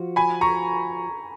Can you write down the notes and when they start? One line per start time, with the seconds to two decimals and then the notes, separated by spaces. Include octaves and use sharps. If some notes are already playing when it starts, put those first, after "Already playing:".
Already playing: F3 F#4
0.16 G#5 B5
0.41 A#5 C#6